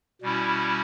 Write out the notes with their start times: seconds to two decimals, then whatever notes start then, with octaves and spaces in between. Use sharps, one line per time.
0.22 B2 G3 C#4 E4